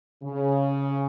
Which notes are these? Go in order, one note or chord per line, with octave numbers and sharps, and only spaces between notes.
C#3